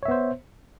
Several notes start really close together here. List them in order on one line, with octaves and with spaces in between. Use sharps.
C#5 E5 B3 C5